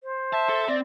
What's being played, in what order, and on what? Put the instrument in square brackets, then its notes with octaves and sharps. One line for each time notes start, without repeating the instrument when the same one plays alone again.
[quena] C5
[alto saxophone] E5 [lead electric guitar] A5
[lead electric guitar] A4
[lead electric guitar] C4 [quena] D5